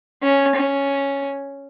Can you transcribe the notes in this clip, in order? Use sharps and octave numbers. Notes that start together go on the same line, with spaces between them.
C#4
C#4